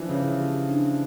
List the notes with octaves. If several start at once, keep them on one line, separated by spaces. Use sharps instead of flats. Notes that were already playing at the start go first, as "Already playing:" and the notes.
Already playing: E3 F3 D4
C#3 E5
G4
D4